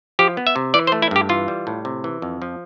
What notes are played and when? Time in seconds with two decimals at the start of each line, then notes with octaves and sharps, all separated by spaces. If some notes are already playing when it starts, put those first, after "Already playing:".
0.19 F3 G4
0.37 B3
0.47 E5
0.56 C3
0.74 E3 D5
0.87 C5
0.92 A3
1.02 E4
1.11 G2 G4
1.29 E3 F4
1.48 G3
1.67 A2
1.85 C3
2.04 E3
2.22 F2
2.42 F3